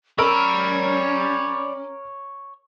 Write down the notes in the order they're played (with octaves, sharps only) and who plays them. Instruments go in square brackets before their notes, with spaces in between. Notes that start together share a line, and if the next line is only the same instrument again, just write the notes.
[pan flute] C#4 [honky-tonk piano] A#4 A#5 E6 [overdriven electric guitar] C#5 [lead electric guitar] D5 B5